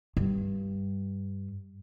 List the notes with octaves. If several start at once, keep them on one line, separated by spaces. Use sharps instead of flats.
G2